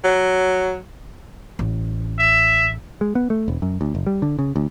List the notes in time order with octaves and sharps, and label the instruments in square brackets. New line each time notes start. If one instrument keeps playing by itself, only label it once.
[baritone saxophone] F#3
[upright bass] A1
[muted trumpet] E5
[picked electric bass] G#3
B3
A3
E1
F#2
D2
F#1
G3
D3
C#3
D2